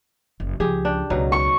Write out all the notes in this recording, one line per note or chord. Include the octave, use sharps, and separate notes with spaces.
F#1
C#2 F3 G4 G#4
D4 G5
C#2 B2 F#3 B3 D#4
C#6